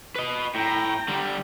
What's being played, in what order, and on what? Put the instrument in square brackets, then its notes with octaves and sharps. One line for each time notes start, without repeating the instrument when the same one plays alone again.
[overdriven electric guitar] B4 D#5
[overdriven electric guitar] A2 [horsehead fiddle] G5 A#5
[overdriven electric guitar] D3 G3